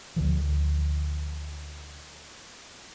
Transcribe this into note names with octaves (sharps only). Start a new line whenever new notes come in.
D2 D3 F3